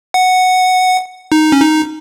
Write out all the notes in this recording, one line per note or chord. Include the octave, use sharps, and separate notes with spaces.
F#5
D#4
C#4
D#4